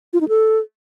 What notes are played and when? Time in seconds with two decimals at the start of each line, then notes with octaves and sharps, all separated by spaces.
0.13 F4
0.21 D#4
0.28 A4